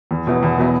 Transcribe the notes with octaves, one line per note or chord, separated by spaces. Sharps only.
E2
B2 F#3 B3 E4
E2
B2 F#3 B3 E4